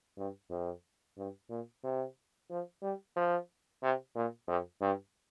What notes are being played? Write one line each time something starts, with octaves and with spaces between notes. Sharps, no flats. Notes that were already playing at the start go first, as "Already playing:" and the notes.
G2
F2
G2
A#2
C3
F3
G3
F3
C3
A#2
F2
G2